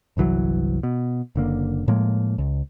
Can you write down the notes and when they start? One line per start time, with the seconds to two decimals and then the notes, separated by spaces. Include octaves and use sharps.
0.17 G1 C2 E3 F#3
0.83 B2
1.36 F#1 D3 A#3
1.88 A2 F3 G#3 A#3
2.38 C#2